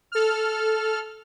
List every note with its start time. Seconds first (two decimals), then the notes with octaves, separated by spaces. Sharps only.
0.12 A4 F6